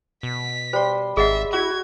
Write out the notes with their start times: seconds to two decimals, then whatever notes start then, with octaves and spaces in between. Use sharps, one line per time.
0.23 B2 B6
0.73 G3 C5 C#5 C6
1.17 G#1 G#4 D#5 E5 F#5
1.53 E4 F#4 G#6